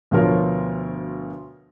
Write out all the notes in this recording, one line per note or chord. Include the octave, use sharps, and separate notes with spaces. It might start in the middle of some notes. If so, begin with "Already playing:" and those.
D2 B2 F3 F4 A#4 C#5